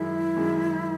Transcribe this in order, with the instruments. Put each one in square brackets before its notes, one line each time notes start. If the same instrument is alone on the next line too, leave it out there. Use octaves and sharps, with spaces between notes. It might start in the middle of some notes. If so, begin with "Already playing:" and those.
Already playing: [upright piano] F#2 D#3 G#3 [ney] E4
[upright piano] F#2 D#3 G#3